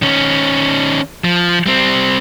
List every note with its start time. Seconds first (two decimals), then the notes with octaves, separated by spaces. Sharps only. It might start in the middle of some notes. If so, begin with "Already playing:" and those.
0.02 D#3 C#4
1.24 F3
1.66 G3 C4